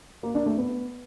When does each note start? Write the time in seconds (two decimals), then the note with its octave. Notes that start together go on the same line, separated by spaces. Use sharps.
0.23 A#3
0.35 D4
0.46 A3
0.58 B3